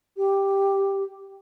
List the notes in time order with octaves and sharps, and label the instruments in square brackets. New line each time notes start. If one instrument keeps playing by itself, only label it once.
[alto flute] G4